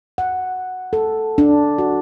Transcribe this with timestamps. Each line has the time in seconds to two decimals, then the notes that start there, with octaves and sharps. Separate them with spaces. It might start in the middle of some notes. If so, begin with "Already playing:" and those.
0.18 F#5
0.93 A4
1.38 D4
1.78 F#4